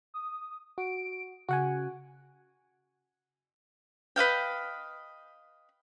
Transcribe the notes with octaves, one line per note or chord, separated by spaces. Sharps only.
D#6
F#4 D7
C#3 F#4 F#5 G#5
B4 D#5 F5 G5